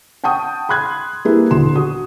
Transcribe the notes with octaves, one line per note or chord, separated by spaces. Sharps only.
F#5 G5 A5 C#6 D#6
B5 C6 F#6 G#6
G3 A#3 E4 G#4 B4
D#1 D2 B2 C6 E7
F#4 D#6